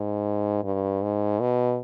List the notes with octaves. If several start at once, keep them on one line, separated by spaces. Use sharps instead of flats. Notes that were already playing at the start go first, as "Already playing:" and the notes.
Already playing: G#2
G2
G#2
B2